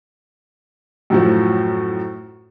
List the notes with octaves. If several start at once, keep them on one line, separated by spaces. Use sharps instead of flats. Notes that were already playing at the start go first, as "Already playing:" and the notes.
F#2 A2 F3